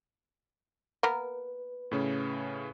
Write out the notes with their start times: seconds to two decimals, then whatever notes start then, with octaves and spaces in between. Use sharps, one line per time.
1.03 A#3 B3 A#4 B4
1.91 A2 C#3 C#4